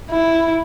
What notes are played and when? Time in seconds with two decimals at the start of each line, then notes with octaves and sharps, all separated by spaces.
0.10 E4